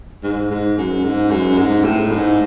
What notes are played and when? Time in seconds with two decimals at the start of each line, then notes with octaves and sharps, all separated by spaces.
0.23 G#2
0.50 G#2
0.78 F#2
1.04 G#2
1.31 F#2
1.58 G#2
1.84 A2
2.11 G#2